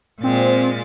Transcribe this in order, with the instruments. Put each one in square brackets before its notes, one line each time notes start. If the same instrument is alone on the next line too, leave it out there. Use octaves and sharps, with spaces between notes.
[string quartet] A#2 G#3 A6 [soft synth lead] C4